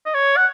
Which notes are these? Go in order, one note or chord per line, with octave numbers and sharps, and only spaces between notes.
D#5
C#5
F#5